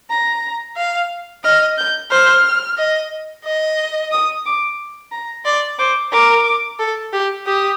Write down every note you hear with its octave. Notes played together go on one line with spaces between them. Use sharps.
A#5
F5
D#5 F6
G6
C5 F6
D#5
D#5
D#6
D6
A#5
D5 C6
C5 D6
A#4 D6
A4
G4
G4 D#6